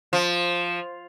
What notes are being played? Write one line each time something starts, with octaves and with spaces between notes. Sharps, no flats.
F3